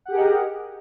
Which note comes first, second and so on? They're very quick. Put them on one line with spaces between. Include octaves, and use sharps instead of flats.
F#5 G4 G#4 A#4 D#5